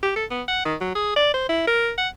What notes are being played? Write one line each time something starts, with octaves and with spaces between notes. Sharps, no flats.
G4
A4
B3
F#5
D#3
F#3
G#4
D5
C5
E4
A#4
F#5